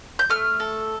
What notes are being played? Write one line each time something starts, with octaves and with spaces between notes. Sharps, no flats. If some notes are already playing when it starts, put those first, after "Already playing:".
G6
A3 F6
A4